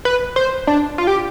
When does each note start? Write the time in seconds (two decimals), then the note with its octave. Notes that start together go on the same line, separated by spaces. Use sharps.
0.05 B4
0.36 C5
0.67 D4
0.98 F4
1.07 G4